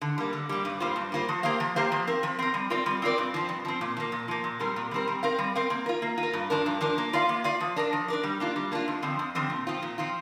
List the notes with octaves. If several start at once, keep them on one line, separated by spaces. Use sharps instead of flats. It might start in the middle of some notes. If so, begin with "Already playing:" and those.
D3
G3 A#3
D3
G3 A#3
G2
G3 A#3 F4 C5
G2
G3 A#3 F4 C5
F3
A#3 G4 C5 F5
F3
A#3 G4 C5 F5
F3
C4 A#4
F3
C4 A#4
G3
C4 F4 A#4 D5
G3
C4 F4 A#4 D5
G2
F3 C4
G2
F3 C4
A#2
F3 A#3
A#2
F3 A#3
A#2
G3 C4 A#4
A#2
G3 C4 A#4
G3
C4 A#4 F5
G3
C4 A#4 F5
A#3
F4 A#4
A#3
F4
A#4
G2
F3 D4 A#4
G2
F3 D4 A#4
A#3
F4 D5 F5
A#3
F4 D5 F5
F3
D4 A#4 D5
F3
D4 A#4 D5
G3
A#3 D4 F4
G3
A#3 D4 F4
F2
D3 F3 C4
F2
D3 F3 C4
A#2
F3 C4 F4
A#2
F3 C4 F4